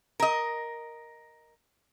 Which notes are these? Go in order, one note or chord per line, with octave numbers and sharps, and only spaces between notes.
A#4 D#5